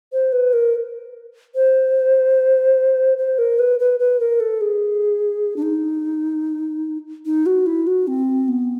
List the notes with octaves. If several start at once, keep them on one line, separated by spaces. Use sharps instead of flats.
C5
B4
A#4
C5
C5
A#4
B4
B4
B4
A#4
A4
G#4
D4
D#4
D#4
F#4
E4
F#4
C4
B3